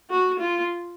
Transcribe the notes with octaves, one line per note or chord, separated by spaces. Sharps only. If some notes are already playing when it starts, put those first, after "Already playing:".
F#4
F4